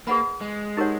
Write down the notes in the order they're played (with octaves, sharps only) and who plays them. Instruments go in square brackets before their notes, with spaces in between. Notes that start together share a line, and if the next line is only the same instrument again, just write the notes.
[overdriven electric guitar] A#3 [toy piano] G#4 B4 D#5 F#5 B5
[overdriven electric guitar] G#3
[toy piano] D#4 G4 A#4 C#5 F#5